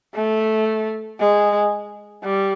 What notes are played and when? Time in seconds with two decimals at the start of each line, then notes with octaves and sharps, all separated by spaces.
0.15 A3
1.19 G#3
2.24 G3